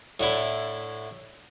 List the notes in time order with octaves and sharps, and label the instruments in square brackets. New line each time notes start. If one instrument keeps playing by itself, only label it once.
[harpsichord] A2 D3 E4 A4